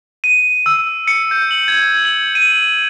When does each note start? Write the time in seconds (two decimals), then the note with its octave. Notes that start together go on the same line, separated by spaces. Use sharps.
0.24 D#7
0.66 E6
1.08 C#7
1.31 G6
1.51 F#7
1.68 G#6
2.05 F#7
2.35 D#7